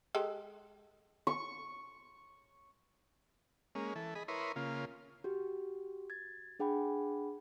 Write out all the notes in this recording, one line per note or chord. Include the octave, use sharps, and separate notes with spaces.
G#3 G4 A4
C#6
G#3 A#3 C#4
E3 A4
G#4 D#5 B5
E4 A#4 B4 C#5 C6 D#6
C#3 A#3 F4
F#4 G4
G#6 A6
D4 G#4 F#5 G5 B5